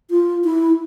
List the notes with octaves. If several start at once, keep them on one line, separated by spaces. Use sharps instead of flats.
F4
E4